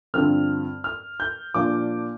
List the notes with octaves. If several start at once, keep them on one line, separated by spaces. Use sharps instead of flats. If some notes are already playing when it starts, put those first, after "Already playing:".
G2 D3 F3 C4 F6
F6
G6
A#2 F3 D4 D6